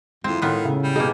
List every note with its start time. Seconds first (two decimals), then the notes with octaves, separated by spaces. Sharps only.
0.24 F2 G#3 C4 E4
0.42 A2 D#3 B3 F4
0.65 C#3
0.83 G3
0.96 B2 A#3 D#4 G#4